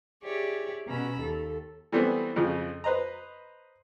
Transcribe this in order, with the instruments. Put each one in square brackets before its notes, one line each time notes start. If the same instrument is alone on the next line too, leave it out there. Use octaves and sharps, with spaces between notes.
[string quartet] E4 G4 G#4 C#5 D5
B2 C#4 A#5 B5 E6
D#2 A4
[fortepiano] E3 G3 A3 B3 C4
F2 C#3 F3
B4 C5 D#5 A#5